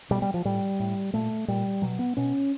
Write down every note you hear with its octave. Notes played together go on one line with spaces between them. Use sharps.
B2 G3
G3
F3
A2 G3
A2
A#2 A3
A#2 G3
B2 F#3
B3
B2 C#4